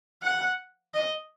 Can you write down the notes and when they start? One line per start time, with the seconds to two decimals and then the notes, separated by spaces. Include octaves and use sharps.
0.22 F#5
0.94 D#5